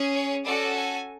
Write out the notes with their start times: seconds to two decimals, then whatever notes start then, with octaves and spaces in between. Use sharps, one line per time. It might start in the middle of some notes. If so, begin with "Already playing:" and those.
Already playing: C#4 G#4
0.14 C#5
0.45 C#4 F#4 A4 D5
0.75 G#5